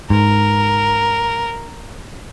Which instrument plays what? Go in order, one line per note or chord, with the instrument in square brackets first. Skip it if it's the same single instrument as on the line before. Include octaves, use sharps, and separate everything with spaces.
[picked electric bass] G#2 [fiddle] A#4